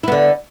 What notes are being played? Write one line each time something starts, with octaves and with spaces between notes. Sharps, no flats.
D3 B3 E4